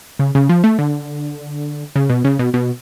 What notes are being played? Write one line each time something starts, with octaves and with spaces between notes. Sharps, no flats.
C#3
C#3
F3
A3
D3
C#3
B2
C#3
B2
B2